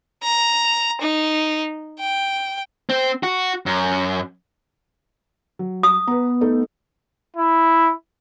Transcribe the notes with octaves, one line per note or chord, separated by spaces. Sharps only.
A#5
D#4
G5
C4
F#4
F#2
F#3
D#6
B3 B4 A#5
A3 D#4 A4
E4